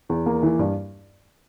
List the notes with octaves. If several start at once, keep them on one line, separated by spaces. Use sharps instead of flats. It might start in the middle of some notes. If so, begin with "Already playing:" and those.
E2
A#3
E3
G2